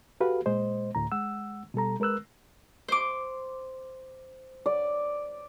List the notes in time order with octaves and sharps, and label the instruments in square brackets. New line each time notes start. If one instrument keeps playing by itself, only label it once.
[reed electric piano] F#4 G4 A4 B4 F5
A#2 G#3 C5 D#5
D2 A2 A#5
G#3 F#5 E6
B2 G3 A4 A#5
G#3 A#4 B4 E6 F#6
[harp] C5 D6
[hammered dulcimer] D5